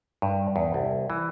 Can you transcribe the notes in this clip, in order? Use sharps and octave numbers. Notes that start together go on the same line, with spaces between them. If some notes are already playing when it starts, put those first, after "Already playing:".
G2
E2
C2
E3